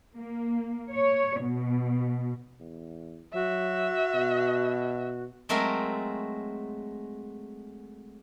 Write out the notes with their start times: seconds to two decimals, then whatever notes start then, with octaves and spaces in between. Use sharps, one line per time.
0.17 A#3
0.92 C#5
1.40 B2
2.60 E2
3.34 F#3 F#4 E5
4.15 B2
5.49 F#3 G#3 A3 C4 A#4